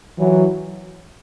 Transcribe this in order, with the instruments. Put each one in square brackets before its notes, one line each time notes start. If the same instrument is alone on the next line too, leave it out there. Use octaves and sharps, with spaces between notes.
[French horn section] E3 F#3